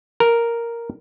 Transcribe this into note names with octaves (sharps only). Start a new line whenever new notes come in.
A#4